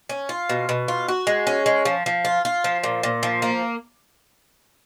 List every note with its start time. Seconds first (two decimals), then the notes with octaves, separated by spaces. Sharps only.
0.09 C#4
0.29 F4
0.49 B2
0.69 B2
0.88 F4
1.08 F#4
1.27 G#3
1.47 C#4
1.66 G#3
1.85 F3
2.06 F3
2.25 F4
2.45 F4
2.64 F3
2.83 A#2
3.03 A#2
3.23 F3
3.42 A#3